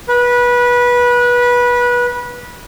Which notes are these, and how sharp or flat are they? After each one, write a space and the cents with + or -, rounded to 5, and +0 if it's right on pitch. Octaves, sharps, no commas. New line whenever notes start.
B4 -20